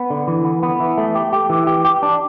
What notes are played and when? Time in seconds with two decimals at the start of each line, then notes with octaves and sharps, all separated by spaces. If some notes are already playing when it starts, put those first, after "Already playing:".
Already playing: B3
0.10 D3
0.28 E3
0.45 B3
0.63 B3
0.80 E3
0.98 A3
1.15 G4
1.33 G4
1.50 E3
1.67 G4
1.85 G4
2.03 D4